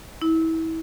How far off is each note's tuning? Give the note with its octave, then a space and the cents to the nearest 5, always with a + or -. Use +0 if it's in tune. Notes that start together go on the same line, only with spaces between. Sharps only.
E4 -30